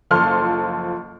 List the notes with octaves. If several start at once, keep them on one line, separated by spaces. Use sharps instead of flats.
F#1 F3 A4 C6 F6